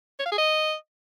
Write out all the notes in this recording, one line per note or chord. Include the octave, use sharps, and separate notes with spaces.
C#5
F5
G#4
D#5